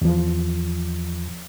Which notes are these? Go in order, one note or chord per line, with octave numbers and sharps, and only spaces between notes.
E2 F3